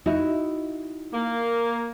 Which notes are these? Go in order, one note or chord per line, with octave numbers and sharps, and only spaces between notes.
D#4 E4 F#4
A#3